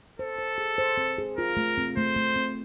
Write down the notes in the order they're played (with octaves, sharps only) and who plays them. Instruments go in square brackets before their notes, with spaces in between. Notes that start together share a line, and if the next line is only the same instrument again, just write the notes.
[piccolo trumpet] A4 [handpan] C5
[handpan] C5
G#4
C5
C4
G#4
[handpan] F4 [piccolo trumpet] A#4
[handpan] A3
C4
[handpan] A3 [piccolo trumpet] C5
[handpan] A3
C4